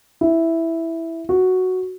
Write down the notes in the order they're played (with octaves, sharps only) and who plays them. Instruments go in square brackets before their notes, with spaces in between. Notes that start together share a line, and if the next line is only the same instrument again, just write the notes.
[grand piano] E4
F#4